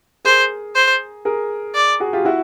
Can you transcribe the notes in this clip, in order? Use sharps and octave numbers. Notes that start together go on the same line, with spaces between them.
G#4 A#4 C5
C5
G#4 A#4
D5
F#4 G#4
F4 G4
E4 F#4